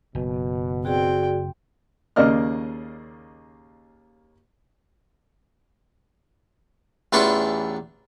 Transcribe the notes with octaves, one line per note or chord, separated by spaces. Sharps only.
F#1 B2
C4 F#4 G#4 D5 G5
D#2 C#3 A#3 D5 D#5 F6
A1 E2 D4 F4 B4 C#6